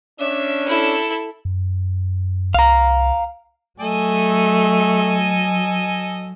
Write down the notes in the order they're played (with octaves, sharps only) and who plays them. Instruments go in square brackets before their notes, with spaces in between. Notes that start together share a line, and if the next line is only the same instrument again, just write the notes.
[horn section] C#4 D4 [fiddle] E5
[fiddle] E4 A4
[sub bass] F#2
[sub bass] C2 [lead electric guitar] F5 A#5
[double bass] F#3 [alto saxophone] A3 [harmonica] A4 D#5 G#5